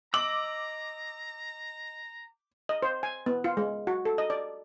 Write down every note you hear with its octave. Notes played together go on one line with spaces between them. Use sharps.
D#5 A#5 D6 E6 F#7
D#5
C5
G#5
B3
F4
G#3
F#4
A4
D#5
D5